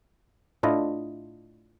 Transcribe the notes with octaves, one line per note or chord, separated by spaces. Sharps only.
A2 D4 E4 F4 D#5